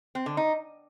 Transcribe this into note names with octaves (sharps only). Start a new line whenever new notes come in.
C4
D3
D#4